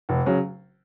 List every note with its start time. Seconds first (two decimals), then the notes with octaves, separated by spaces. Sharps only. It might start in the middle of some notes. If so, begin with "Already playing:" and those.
0.09 F1
0.26 C#3 F#3